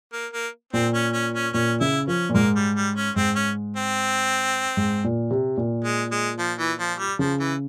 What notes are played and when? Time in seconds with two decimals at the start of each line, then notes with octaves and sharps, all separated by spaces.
0.13 A#3
0.33 A#3
0.73 A#2 C4
0.94 C#4
1.14 C#4
1.34 C#4
1.54 A#2 C#4
1.81 C#3 E4
2.08 F3 C#4
2.29 A#2
2.34 G#2 A#3
2.56 G3
2.75 G3
2.96 C#4
3.16 G#2 C4
3.36 C#4
3.77 C4
4.77 G#2
5.04 A#2
5.31 C3
5.57 A#2
5.84 G#3
6.12 G#3
6.39 F3
6.59 E3
6.80 F3
6.99 G3
7.19 C#3 F3
7.40 E3